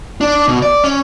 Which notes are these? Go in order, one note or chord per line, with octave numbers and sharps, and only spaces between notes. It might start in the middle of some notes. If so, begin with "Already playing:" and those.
D4
B2
D5
C#4